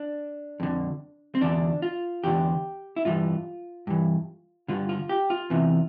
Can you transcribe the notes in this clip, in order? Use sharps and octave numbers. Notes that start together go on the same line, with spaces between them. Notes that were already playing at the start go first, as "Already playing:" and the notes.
Already playing: D4
F2 D3
C4
E2 D3 D4
F4
E2 D3 G4
E4
G2 E3 F4
G2 E3
G2 D3 F4
F4
G4
F4
E2 C3 E3